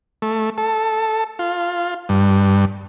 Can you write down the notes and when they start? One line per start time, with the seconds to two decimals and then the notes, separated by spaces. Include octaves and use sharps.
0.22 A3
0.58 A4
1.39 F4
2.09 G2